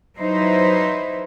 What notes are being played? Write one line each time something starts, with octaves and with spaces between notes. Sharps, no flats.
F#3 D#4 E4 B4 C5